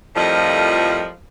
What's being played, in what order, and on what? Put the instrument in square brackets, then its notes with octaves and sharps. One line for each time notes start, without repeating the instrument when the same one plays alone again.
[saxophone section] F2 A2 F3 G3 A#4 D#5